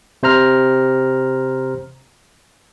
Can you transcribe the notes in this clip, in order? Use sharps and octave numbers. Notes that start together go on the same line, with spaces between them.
C3 C5 A#5 F6